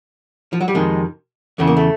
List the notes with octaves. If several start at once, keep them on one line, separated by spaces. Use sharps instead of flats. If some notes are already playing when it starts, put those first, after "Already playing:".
F3
F#3
G3
F2 C3 D#3 G#3
E2 C#3 E3 A3
A#3
A3